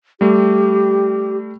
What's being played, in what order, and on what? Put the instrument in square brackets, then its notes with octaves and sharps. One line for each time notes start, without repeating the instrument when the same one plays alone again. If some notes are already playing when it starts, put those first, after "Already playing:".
[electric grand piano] G3 A3 [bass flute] G4